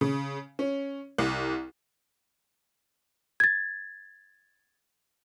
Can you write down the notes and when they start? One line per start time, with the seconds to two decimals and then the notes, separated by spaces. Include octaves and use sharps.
0.01 C#3
0.59 C#4
1.18 C2
3.40 G#6 A6